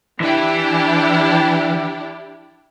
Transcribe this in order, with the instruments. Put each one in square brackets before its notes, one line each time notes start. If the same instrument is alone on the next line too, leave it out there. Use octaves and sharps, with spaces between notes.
[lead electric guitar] E3 [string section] D4 E4 G4